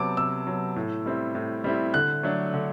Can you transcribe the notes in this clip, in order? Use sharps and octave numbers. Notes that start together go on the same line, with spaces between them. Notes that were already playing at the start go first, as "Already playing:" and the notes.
Already playing: C3 F#3 B3 A5 D6
C3 E6
F#3 B3
A2
G3 C4 E4
A2
G3 C4 E4
D3 F#6
F#3 A3 D4
D3